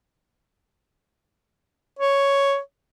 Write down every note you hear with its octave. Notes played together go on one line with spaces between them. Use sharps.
C#5